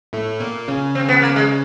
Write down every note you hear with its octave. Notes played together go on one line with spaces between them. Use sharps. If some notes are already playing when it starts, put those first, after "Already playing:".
A2 A3
A#2 A#3
C#3 C#4
C4
B3
A#3
G#3